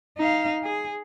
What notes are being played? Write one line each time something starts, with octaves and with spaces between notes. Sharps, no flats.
D#4 F5
G#4